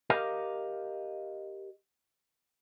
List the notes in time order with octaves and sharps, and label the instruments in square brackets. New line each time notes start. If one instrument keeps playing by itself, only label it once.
[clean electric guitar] G4 A#4 D#5 F5